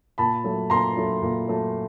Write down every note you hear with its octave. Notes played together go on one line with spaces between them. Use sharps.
A#2 A5 B5
F#3 A3
A#2 A#5 C6
F#3 A3
A#2
F#3 A3